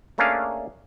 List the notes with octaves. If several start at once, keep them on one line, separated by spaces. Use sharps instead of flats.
A3 A#3 C#4 D4 G#4 F5